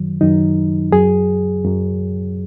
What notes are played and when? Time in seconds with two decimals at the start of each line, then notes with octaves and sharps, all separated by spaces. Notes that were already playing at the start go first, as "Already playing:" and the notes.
Already playing: F#2 D#3 F#3
0.21 F#2 D#3 F#3 D#4
0.92 F#2 F#3 G#4
1.64 F#2 F#3